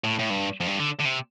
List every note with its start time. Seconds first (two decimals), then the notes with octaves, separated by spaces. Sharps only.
0.04 A2
0.19 A2
0.30 G2
0.60 F2
0.67 G2
0.80 D3
1.00 D3
1.05 C3